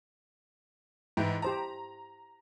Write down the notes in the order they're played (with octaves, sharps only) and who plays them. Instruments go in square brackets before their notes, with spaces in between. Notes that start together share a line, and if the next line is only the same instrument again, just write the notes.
[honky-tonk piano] G#2 E3 [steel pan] E4 G5
[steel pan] G4 C5 A5 [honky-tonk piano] A#5